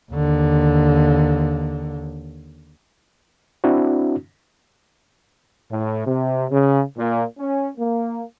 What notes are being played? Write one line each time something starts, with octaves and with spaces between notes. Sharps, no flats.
D#2 D3
C4 D4 E4 F#4
A2
C3
C#3
A#2
C#4
A#3